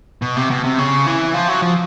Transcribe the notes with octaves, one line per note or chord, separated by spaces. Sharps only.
B2
C3
B2
C3
C#3
E3
F3
F#3
F3